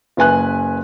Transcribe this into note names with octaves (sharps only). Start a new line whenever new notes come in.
F#1 B4 G#5 F#6